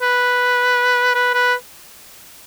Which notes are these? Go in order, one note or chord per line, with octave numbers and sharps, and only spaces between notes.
B4
B4
B4